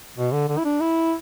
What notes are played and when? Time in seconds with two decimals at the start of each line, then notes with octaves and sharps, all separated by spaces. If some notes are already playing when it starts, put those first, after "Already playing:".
0.17 B2
0.33 D3
0.48 D3
0.58 E4
0.65 D4
0.80 E4